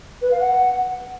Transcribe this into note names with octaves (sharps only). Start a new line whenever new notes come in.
B4
F5
F#5